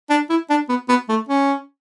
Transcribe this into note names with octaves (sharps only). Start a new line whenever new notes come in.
D4
E4
D4
B3
B3
A3
C#4